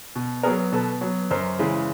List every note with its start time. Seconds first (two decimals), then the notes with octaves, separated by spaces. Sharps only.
0.16 B2
0.43 F#3 B3 G#4 A#4
0.72 B2 A4 B4
1.01 F#3 B3
1.31 F#2 A#4 C5
1.59 C#3 E3 G#3